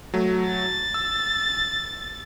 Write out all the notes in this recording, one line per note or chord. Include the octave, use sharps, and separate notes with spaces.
F#3 A3
A6
E6